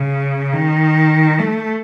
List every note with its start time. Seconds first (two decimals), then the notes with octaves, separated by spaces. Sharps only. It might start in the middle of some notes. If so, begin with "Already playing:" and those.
Already playing: C#3
0.53 D#3
1.39 A3